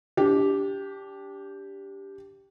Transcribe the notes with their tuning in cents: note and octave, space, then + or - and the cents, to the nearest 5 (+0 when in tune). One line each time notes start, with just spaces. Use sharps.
D4 -30 G4 +0